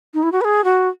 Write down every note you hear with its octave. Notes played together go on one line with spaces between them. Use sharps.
D#4
E4
F#4
B4
G#4
F#4